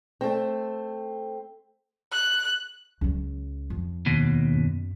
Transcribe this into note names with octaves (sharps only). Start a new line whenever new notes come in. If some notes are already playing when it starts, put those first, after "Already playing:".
A3 C4
F#6
C#2 F#3
F2
D#2 B2
F#2